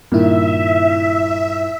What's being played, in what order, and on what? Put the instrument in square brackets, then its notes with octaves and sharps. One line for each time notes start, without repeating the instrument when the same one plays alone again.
[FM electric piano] G2 E4 [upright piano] A#2 D#3 [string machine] E5